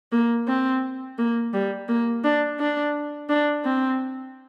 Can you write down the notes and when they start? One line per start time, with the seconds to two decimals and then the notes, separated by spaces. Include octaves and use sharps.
0.12 A#3
0.47 C4
1.18 A#3
1.54 G3
1.88 A#3
2.24 D4
2.60 D4
3.29 D4
3.65 C4